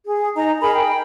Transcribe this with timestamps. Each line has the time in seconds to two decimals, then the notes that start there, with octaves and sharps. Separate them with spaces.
0.06 G#4
0.36 D#4 A#5
0.61 G#4 A#4 B5
0.75 G5